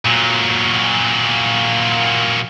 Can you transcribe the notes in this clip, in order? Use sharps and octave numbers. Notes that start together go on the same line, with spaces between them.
A#2 F#3